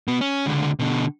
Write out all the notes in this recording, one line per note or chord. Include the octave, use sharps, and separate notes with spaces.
B2 B3
C#4
C#2 D3
B2 D3